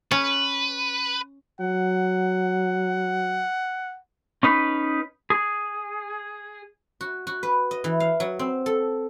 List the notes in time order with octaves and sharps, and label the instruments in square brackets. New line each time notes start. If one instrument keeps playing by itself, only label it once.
[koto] C#4 [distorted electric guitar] B4
[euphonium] F#3 [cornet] F#5
[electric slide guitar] C#4 D#4 B4
G#4
[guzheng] F#4
F#4
B4
D#5
E3
F5
F#3
C4
A4